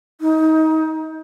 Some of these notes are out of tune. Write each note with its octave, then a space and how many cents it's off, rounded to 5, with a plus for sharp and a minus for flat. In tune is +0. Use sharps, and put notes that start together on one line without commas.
D#4 +25